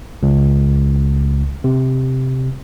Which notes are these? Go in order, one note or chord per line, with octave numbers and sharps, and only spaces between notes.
C#2
C3